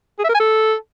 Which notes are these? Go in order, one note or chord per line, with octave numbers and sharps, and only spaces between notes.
G#4
E5
A#4
G#5
A4